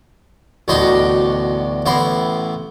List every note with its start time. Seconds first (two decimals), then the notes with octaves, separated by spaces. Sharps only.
0.68 A1 D2 B2 D4 G4 D#5
1.86 A1 A2 B3 E4 C6